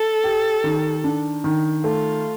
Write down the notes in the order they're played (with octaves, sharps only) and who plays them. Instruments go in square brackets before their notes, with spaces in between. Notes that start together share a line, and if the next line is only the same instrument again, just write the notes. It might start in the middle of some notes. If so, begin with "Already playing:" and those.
Already playing: [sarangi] A4
[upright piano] G4
D#3
D4
D#3
[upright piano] A3 [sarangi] F4